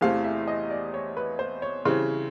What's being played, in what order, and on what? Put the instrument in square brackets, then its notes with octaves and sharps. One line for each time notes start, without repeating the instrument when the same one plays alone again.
[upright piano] E2 C3 E3 A3 C4 F5
E5
D#5
D5
C#5
B4
C5
C#5
C#3 E3 G3 C4